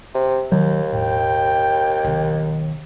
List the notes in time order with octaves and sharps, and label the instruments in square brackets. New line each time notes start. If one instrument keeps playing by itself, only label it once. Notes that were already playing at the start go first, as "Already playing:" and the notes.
[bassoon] C3
[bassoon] D#2 [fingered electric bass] D#3 F#3
[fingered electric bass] E1 A2 [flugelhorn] G5
[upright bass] B1 D#3